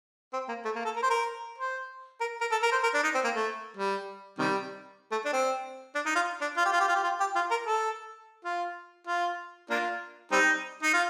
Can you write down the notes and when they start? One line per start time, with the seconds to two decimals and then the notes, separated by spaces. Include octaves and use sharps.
0.33 C4
0.49 A#3
0.65 A3
0.76 A#3
0.85 A4
0.96 A#4
1.03 C5
1.10 A#4
1.58 C5
2.21 A#4
2.41 A#4
2.52 A4
2.63 A#4
2.72 C5
2.83 A#4
2.94 D4
3.03 D#4
3.15 C4
3.24 A#3
3.35 A3
3.77 G3
4.38 C3 D#3 G3
5.12 A3
5.25 D4
5.33 C4
5.95 D4
6.06 D#4
6.15 F4
6.41 D4
6.57 F4
6.65 G4
6.73 F4
6.80 G4
6.88 F4
6.95 G4
7.03 F4
7.20 G4
7.35 F4
7.51 A#4
7.67 A4
8.45 F4
9.07 F4
9.70 A#3 D4 F4
10.32 G3 C4 D#4
10.83 D#4
10.94 F4